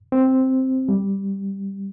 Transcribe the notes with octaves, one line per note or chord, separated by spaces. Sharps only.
C4
G3